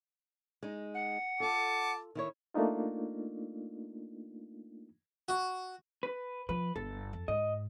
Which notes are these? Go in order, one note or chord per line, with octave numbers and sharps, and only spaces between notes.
G#3 D#4
F#5
F4 A4 A5 D6
D#3 E4 C#5
A3 A#3 D4 D#4 F4
F#4
B4
F3 B4
G1 A4
F2
G#2 D#5